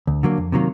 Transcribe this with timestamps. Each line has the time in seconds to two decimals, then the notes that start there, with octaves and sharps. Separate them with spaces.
0.07 D2
0.23 D3 F#3 A#3
0.37 F2
0.52 C3 D#3 F#3 A#3